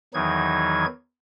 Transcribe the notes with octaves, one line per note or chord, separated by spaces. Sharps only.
E2 D#3 E3 F#3 D#4 G#6